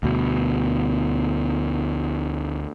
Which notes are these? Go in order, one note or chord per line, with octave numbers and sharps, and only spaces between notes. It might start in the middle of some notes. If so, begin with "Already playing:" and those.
D2 B2